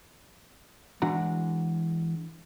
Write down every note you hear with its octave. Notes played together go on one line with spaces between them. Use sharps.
E3 G#3 D4 F#4 A#5